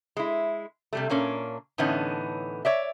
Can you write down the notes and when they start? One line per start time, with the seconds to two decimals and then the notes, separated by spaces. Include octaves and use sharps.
0.17 G#3 E4
0.93 C3 G3 A3
1.10 A#2 A#3 C#4 D4
1.78 A2 D3 E3 B3 C#4 D#4
2.65 C#5 D5 E5